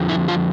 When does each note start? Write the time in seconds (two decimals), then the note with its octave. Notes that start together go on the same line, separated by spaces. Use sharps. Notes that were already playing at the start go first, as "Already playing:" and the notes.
Already playing: F2 D3 F3
0.09 E4
0.28 F4